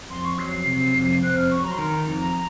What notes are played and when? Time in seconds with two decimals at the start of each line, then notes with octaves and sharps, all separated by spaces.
0.10 F2 C6
0.25 C#6
0.38 F#3 C7
0.53 C7
0.66 C3
0.95 F2
1.23 C4 F#6
1.36 F6
1.50 F#3 C#6
1.64 A#5
1.71 C6
1.78 D#3 A#5
2.07 F2